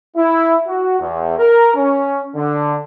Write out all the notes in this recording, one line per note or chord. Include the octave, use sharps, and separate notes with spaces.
E4
F#4
E2
A#4
C#4
D3